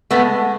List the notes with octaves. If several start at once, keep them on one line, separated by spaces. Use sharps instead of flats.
G#3 A3 B3